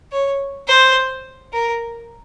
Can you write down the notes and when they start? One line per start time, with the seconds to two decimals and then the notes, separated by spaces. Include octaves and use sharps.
0.12 C#5
0.68 C5
1.53 A#4